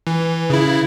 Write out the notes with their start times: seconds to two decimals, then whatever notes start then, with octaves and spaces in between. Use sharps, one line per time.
0.07 E3
0.50 C#3 E4